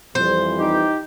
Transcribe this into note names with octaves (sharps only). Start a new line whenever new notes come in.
F2 E3 G3 C5
D#4 G4